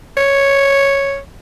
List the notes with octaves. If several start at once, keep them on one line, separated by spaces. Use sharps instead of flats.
C#5